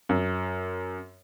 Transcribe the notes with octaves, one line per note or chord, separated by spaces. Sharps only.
F#2